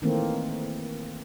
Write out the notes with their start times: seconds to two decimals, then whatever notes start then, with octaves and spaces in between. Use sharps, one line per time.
0.02 D#3 E3 A3 A#3 C4